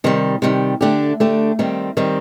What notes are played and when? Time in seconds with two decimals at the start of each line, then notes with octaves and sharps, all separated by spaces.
0.04 C3 D#3 G3
0.42 C3 D#3 G3
0.81 D3 A3 D4 G4
1.20 D3 A3 D4 G4
1.59 D#3 G3 C4
1.97 D#3 G3 C4